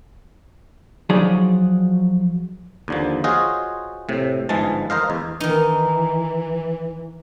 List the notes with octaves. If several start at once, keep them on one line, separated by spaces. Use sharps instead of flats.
F3 F#3 D#4 G#4 D5
D#2 D3 F3
F4 F#4 G#4 C5 C#5 D#5
A2 C3
G1 G#2 E3 F3 G#3 A5
A#4 C5 D#5 F5
E2
D#3 E3 D#4